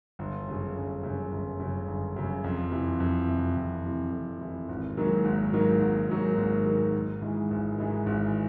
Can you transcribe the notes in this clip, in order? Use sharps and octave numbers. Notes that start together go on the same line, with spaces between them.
G1
F#2 C#3
G1
F#2 C#3
G1
F#2 C#3
G1
F#2 C#3
F2
C3 E3
F2
C3 E3
F2
C3 E3
F2
C3 E3
G#1
G#2 D#3 F#3 A#3
G#1
G#2 D#3 F#3 A#3
G#1
G#2 D#3 F#3 A#3
G#1
G#2 D#3 F#3 A#3
G#1
G#2 E3 G#3
G#1
G#2 E3 G#3
G#1